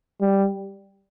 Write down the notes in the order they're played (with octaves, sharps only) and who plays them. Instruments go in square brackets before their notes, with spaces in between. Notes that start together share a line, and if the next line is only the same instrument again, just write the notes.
[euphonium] G3